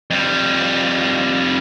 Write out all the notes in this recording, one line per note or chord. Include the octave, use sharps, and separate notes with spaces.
F2 G3